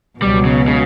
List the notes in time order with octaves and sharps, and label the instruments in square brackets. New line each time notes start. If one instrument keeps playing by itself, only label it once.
[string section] C#2 B2 F#3 [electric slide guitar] G3
[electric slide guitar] C#3
C#3